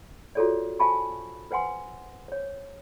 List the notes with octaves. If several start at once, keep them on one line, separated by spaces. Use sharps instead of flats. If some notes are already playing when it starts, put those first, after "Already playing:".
F4 F#4 G#4 A4 C#5 D5
C5 F5 G#5 A5 B5 C#6
B4 C5 F#5 G#5 C6
C5 C#5